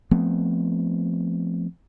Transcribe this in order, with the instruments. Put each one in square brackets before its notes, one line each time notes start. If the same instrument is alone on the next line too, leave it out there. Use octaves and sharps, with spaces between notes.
[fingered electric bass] F3 A3 B3 C4